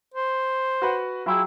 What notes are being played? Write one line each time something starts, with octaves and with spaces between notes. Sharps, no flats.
C5
F#4 B4 F#5
F#3 E4 F4 G#4 G5